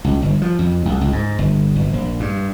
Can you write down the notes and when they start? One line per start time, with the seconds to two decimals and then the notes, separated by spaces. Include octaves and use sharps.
0.04 C#2
0.22 G1
0.42 F3
0.59 F2
0.85 C2
1.01 C#2
1.13 G#2
1.39 G1
1.76 G1
1.94 A#1
2.20 G2